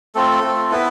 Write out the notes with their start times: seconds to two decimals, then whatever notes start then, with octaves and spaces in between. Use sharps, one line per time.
0.15 A3 C4 F4 A4
0.43 A3 C4 F4
0.71 B3 E4 B4